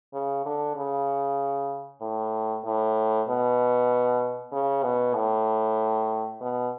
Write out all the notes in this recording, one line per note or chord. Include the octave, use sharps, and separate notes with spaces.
C#3
D3
C#3
A2
A2
B2
C#3
B2
A2
B2